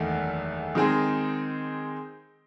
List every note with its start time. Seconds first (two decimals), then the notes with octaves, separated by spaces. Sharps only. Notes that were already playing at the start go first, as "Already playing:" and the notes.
Already playing: F#1 E2 D#3 A3
0.75 D#3 G#3 C4 D#4 G#4